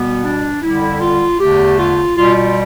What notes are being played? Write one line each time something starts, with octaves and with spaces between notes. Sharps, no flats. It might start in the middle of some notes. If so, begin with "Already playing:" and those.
Already playing: B2 G3 B3
D4
F2 D3 G3 E4
F4
E2 D3 A3 G4
F4
B2 G3 F4
F4